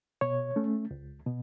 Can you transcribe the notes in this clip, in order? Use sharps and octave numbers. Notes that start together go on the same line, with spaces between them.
B2 C#5
A3 C#4
C#2
B2